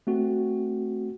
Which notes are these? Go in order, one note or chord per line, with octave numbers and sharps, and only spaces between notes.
A3 C4 F#4